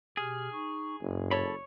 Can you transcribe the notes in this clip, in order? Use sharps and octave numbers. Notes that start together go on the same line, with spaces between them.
B2 G4 G#4 F6
D#4 C#6
F#1 G2
A4 C#5 A5 B5